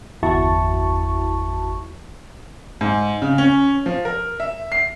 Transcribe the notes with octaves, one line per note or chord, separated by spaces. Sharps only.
G1 E2 E4 F#4 A5 C#6
G#2
C#3
C#4
F3
A#4
E5
C7